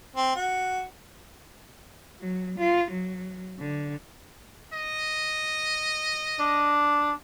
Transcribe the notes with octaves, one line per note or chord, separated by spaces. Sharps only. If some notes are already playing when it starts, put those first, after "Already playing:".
C4
F#4
F#3
F4
F#3
D3
D#5
D4